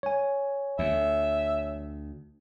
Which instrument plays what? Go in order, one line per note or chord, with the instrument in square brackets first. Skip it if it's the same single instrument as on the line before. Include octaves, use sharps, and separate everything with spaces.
[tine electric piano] C#5 G#5
[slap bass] D2 [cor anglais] E5